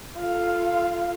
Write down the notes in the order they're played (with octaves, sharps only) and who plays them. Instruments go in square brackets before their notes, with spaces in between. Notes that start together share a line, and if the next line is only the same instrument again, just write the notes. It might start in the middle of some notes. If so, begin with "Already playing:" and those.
[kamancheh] F4 A4